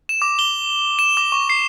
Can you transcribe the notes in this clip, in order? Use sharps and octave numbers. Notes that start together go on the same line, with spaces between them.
E7
D6
G7
E7
D6
C#6
C7